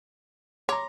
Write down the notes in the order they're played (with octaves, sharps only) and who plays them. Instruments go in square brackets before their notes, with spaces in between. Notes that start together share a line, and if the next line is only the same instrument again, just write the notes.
[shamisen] C#5 [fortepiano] A#5 C6 D6